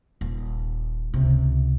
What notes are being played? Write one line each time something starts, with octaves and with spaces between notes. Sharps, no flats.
D#1
C#2 C3